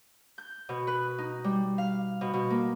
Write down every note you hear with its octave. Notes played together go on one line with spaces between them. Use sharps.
G6
B2
B4
D#4
G3
F5
B2
B2
A#3